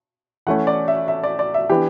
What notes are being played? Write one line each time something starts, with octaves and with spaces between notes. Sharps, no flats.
E3 A3 C#4 F#5
D5
E5
E5
D5
D5
E5
E3 B3 D4 G4